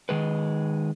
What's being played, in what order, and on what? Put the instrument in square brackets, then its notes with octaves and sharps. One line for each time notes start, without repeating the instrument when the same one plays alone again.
[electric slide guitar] D#3 G#3 B4